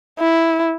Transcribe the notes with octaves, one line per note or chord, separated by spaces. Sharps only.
E4